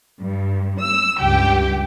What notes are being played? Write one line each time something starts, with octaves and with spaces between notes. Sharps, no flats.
G2
E6
C#2 G2 G4 G5